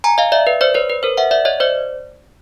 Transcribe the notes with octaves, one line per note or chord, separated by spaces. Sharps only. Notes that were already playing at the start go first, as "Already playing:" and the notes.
G#5 A#5
D#5 F5
D5 E5
B4
C5 D5
B4 C#5
B4
A#4 C5
E5 F#5
D5 E5
C#5 D#5
C5 D5